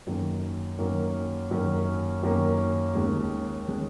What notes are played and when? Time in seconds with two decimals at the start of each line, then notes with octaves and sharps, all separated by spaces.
0.07 F#2 D#3 A#3 C#4
0.78 F#2 D#3 A#3 C#4
1.51 F#2 D#3 A#3 C#4
2.22 F#2 D#3 A#3 C#4
2.95 D#2 D#3 G#3 C#4
3.68 D#3 G#3 C#4